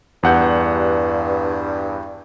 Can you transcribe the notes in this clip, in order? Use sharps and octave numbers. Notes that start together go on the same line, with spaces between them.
E2 G2 F#5 G6